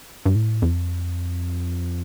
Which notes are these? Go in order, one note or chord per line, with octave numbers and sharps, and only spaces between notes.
G2
A2
F2